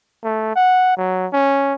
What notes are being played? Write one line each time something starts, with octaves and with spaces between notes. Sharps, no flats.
A3
F#5
F#3
C#4